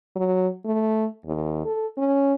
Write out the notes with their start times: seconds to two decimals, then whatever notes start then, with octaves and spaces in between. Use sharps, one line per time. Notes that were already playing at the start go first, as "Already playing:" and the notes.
0.16 F#3
0.65 A3
1.25 D#2
1.65 A4
1.98 C#4